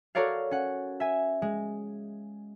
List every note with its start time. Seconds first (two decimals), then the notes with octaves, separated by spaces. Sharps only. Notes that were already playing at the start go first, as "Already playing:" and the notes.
0.15 F#4 A4 A#4 C#5 D5 F5
0.51 C#4 F#5
1.00 E5 G#5
1.42 G#3